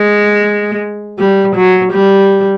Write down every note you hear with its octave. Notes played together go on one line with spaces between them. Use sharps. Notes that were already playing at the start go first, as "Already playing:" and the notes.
Already playing: G#3
G3
F#3
G3